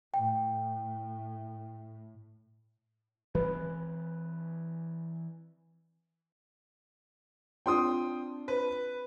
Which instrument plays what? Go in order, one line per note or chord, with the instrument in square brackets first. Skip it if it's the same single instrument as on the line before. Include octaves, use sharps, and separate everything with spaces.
[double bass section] A2 [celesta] G5
[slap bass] E3 G#3 C4 [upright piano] B4
[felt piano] C4 D4 F4 [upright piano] G5 C6 D#6
[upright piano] B4